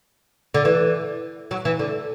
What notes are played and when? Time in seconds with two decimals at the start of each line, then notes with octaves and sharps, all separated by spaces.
0.54 D3
0.65 E3
1.51 F#3
1.65 E3
1.79 D3